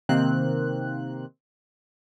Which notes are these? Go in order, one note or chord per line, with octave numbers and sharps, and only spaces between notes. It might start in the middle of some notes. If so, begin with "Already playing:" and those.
C3 D#3 A#3 C4 F#6